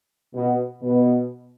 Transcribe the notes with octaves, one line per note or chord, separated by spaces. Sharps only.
B2
B2